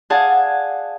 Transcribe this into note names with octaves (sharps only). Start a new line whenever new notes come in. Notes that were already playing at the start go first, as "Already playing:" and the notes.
G#4 D5 F5 F#5 G#5 A5